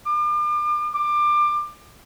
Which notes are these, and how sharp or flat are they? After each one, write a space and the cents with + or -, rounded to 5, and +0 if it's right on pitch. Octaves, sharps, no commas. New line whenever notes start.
D6 +40
D6 +25